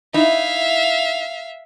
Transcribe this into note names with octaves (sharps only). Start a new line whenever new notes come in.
D#4 E4 E5 F5